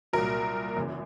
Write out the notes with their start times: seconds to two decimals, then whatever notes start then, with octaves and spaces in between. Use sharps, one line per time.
0.13 C2 A#2 F#3 A#4
0.76 G#1 F#2 C#3 E3